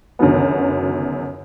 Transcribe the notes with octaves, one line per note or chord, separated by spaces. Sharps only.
C#2 F#2 D3 D#3 F#3 B3